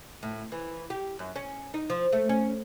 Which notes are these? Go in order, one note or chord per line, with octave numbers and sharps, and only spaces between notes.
A2
E3
G4
F#2
C#4
D#4
F3
A3
C#4